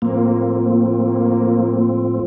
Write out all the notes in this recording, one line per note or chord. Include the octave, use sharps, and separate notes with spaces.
A2 F3 A#3 C4